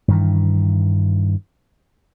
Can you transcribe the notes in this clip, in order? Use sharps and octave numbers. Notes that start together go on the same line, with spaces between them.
G2 D#3 E3